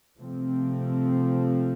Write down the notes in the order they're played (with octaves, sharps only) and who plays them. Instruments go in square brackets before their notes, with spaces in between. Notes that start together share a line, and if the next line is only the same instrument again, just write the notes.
[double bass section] C3 F3 A3 C4